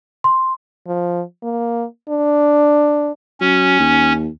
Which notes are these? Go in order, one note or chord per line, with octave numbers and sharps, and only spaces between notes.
C6
F3
A#3
D4
F#3 C#4
D#2